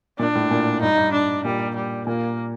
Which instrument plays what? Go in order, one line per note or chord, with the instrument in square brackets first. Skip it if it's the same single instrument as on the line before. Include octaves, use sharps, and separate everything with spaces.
[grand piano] A#2 [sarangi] D4
[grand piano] A2
A#2
[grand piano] G2 [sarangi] D#4
[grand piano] G2
[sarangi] D4
[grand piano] A#2 [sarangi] G3
[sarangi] G3
[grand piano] A#2 [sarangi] A#3